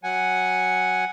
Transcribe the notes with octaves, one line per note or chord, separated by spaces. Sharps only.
F#3 F#5 G#5